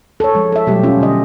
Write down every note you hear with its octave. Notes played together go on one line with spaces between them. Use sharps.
A4 C#5
F3 G#3
A4 E5
B2 F#3 G3 A3 G4
C#4 F4
D3 D#5